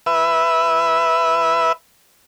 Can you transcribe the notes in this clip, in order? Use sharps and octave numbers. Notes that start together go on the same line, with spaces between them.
B4 E5